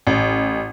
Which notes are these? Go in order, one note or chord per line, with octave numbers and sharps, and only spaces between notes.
A1